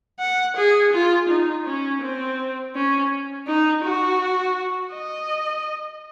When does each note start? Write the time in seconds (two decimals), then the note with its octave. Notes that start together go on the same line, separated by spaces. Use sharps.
0.20 F#5
0.57 G#4
0.92 F4
1.29 D#4
1.66 C#4
2.02 C4
2.75 C#4
3.47 D#4
3.84 F#4
4.94 D#5